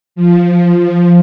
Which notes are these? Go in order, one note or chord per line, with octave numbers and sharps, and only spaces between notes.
F3